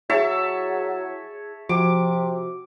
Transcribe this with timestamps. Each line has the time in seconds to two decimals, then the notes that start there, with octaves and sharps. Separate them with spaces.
0.10 F#3 E4 G#4 C#5 E5 A5
1.69 C3 F3 F#4 D6